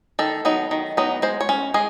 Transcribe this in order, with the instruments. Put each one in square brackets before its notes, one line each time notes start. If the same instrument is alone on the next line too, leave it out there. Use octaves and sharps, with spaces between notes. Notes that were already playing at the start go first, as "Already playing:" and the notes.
[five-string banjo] D#3 A4
F#3 B3 D#4
D#3
F#3 B3 D#4
G#3 C5
C#5
C#4
G#3 G#4